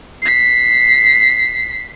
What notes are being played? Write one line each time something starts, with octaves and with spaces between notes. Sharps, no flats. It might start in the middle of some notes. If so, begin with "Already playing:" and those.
B6 C7